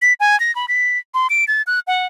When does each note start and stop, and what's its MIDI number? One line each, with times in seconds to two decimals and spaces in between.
0.02 0.13 95
0.20 0.38 80
0.40 0.54 94
0.55 0.66 83
0.68 0.98 95
1.14 1.27 84
1.30 1.45 98
1.48 1.62 93
1.67 1.79 90
1.87 2.06 78